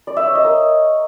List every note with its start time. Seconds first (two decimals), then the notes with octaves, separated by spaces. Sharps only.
0.07 D5
0.17 E5
0.26 C#5
0.35 D#5
0.44 A#4